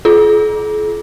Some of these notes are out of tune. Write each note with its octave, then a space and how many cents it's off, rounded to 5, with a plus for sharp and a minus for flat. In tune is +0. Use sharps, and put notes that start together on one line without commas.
F4 -15 G#4 +45